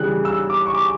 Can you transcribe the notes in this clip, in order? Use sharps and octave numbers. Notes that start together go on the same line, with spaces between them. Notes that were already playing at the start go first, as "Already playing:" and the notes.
Already playing: C#3 E3 G3 F#6
E6
D6
C#6
D6